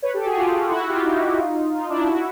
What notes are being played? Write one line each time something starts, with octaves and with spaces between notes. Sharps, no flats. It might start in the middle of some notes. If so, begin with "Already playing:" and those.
B4 C#5
G4 A4
F#4 G#4
F4 G4
E4 F#4
F4 G4
D#4 F4
D#4 F4
D4 E4
E4 F#4